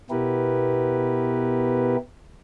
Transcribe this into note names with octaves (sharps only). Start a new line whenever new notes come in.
B2 B3 E4 G4 A#4 B4